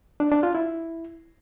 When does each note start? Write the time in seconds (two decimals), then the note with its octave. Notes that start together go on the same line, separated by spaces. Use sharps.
0.20 D4
0.32 D4
0.43 F4
0.55 E4